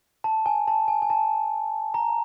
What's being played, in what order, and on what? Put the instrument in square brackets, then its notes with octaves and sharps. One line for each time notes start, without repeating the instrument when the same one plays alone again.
[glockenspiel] A5
G#5
A5
G#5
G#5
A5
A#5